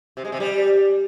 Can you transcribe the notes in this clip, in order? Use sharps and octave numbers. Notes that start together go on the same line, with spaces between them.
C3
G#3
C3
G3